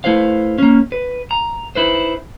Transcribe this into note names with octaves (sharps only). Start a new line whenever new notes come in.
A3 E4 B4 C5 F5
A#3 C#4
B4
A#5
D#4 E4 B4 C5